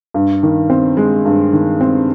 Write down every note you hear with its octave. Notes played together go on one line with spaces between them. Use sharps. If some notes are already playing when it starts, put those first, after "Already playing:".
G2
D#3
C4
G#3
G2
D#3
C4